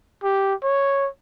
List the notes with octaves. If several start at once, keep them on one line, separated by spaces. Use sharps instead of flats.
G4
C#5